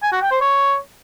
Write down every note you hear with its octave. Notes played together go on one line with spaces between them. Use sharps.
G#5
F#4
G5
C5
C#5